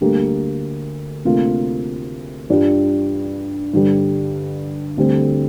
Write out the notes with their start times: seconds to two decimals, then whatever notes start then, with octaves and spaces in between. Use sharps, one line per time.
0.01 D2 D3 G3 A#3 G4
1.25 D2 C3 A#3 F4
2.50 G2 G3 D4 F4
3.73 G2 D3 G3
4.97 D2 D3 G3 C4